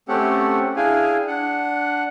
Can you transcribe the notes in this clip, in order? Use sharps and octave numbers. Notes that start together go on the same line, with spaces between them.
A3 C4 C#4 G4 A4 F#5
D4 E4 G#4 F5 G5 G#5
D4 F#5